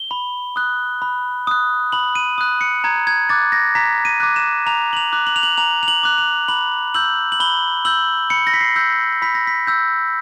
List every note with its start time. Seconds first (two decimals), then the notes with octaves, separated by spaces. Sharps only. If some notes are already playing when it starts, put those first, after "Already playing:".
Already playing: G7
0.11 B5
0.56 D#6 F#6
1.02 B5
1.47 D#6 F#6
1.92 B5 F#7
2.15 D#7
2.38 D#6 F#6
2.61 C#7
2.84 A#5 G#6
3.07 G#6
3.29 D6 F#6 A6
3.52 A#6
3.75 A#5 B6
4.05 D#7
4.20 D6 F#6
4.36 E7
4.66 A#5 F7
4.93 F#7
4.97 F7
5.12 D6 F#6
5.27 F#7
5.36 F7
5.43 F#7
5.57 A#5 F7
5.83 F7
5.88 F#7
6.03 D6 F#6
6.18 F7
6.48 B5 F#7
6.94 E6 G6 F#7
7.32 F#7
7.40 B5 G7
7.85 E6 G6 F#7
8.30 B5 C#7
8.47 A#6
8.54 B6
8.61 C7
8.76 E6 G6
9.22 B5 B6
9.35 A#6
9.47 B6
9.67 E6 G6